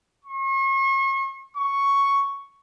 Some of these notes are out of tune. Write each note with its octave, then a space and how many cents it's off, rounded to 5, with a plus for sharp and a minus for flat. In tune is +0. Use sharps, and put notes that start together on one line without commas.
C#6 -40
C#6 +0